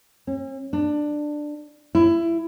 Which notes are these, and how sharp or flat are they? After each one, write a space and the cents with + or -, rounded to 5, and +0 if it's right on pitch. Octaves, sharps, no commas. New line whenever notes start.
C#4 -45
D4 +15
E4 +20